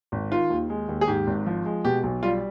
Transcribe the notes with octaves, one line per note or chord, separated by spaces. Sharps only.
G#1
D#3 F4
D#2
G#3
D#2
G#4
G#2 G4
G#1
F3
G#3
B2 G4
B1
G3 F4